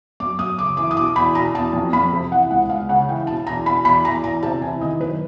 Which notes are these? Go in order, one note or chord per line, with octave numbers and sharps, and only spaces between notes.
F#2 D6
F#2 D#6
C#3 D6
E3 D6
D#6
B2 D6
E2 B5
B2 A#5
E2 A5
F2
F2 B5
C3
E3 F#5
C#2 F#5
C#2 F5
C#3 F#5
E3 G5
B2 A5
E2 A#5
B2 B5
E2 B5
E2 A#5
E2 A#5
C3 A5
E3 G#5
D#3 D#5
F#2 B4